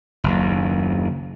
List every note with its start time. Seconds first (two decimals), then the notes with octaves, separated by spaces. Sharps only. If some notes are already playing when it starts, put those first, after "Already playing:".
0.24 F#1 D#2